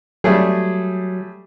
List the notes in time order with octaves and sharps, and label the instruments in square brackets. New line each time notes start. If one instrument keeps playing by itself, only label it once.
[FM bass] F#3 [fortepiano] G3 A3 G#4